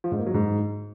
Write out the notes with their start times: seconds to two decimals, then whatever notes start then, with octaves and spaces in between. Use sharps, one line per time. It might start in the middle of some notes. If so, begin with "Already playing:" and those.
0.04 F3
0.12 G#2
0.19 A#3
0.27 F#3
0.34 G#2